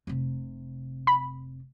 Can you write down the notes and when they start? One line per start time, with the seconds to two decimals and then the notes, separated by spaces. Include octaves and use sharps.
0.07 F1 C3
1.07 B5